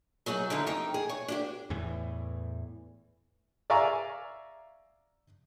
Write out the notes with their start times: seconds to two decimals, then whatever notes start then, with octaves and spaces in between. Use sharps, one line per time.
0.26 F#3 D#4 F#4 G#4
0.50 D3 E3 D#4 G4 A#4
0.67 F2 D#4 G5
0.94 G#4
1.09 C#5
1.28 D4 F#4 G4
1.70 E2 A2 E3
3.70 D5 E5 F5 G#5 A#5 C#6